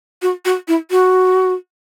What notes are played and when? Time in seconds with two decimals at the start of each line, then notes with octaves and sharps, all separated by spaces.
0.22 F#4
0.45 F#4
0.68 E4
0.91 F#4